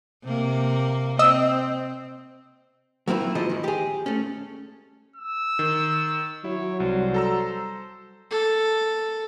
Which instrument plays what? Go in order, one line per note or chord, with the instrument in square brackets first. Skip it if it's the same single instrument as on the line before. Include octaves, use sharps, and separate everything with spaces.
[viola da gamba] C3 A#3
[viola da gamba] C4 [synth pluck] D#5 E6
[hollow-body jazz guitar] F#3 A#3 C4 E4 F4
E3 F3 G#3 E4 C5 D#5
G#2 D#3
G4 G#4
A3 C#4
[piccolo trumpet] E6
[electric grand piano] D#3
[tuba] F#3 [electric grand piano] E4 [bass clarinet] F#4 [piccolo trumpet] C#5
[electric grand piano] C2 [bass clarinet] G3 [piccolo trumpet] C5
[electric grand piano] A4 A#5 E6
[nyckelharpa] A4